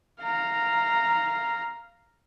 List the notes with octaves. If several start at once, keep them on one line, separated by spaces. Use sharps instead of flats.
F5 A#5